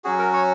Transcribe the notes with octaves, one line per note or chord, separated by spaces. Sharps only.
F#3 C#4 F#4 G#4
A#4
C#5